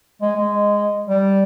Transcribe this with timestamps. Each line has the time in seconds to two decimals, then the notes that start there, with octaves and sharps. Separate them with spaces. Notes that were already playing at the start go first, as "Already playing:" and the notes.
0.22 G#3
0.36 G#3
1.08 G3